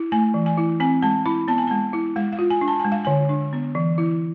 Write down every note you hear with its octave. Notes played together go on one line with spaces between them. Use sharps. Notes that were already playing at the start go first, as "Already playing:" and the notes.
Already playing: E4
A3 G#5
E3
G#5
E4
C4 G#5
G#3 A5
E4 B5
B3 A5
G#5
G#3 A5
E4
G#3 F5
F5
F4
G#5
D4
A5
G#5
G#3
F5
D3 G#5
D4
B3
E3
E4